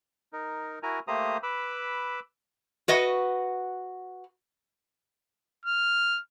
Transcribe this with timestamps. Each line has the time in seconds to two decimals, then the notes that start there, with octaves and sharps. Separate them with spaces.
0.33 D#4 A#4
0.83 E4 F#4 A#4 G#5 A#5
1.08 A3 A#3 G4 C5 A#5 D#6
1.43 B4 B5 D6 E6
2.88 F#4 B4 D#5 F#5
5.66 F6